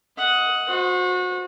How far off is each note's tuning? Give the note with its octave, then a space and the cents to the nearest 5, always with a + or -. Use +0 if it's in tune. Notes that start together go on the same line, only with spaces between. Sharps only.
D#5 +20 F#5 +0
F#4 -30 C5 +0